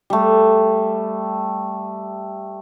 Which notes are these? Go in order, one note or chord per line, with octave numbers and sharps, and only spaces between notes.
G3 A3